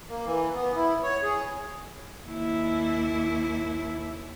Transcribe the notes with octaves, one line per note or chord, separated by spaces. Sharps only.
A#3
E3
B3
E4
C#5
G#4
D#2 E4